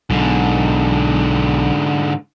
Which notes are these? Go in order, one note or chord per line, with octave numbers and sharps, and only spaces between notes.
B1 G#2 D3